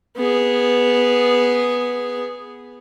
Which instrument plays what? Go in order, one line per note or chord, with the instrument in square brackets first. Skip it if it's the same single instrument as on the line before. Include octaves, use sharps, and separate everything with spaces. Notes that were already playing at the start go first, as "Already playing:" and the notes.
[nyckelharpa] B3 G#4